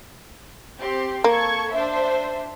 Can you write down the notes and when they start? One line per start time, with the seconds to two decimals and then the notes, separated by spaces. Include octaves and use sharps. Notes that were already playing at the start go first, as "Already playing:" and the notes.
0.79 C4 G4 C6
1.24 A#3 A4 C#6 G#6
1.71 D4 C5 E5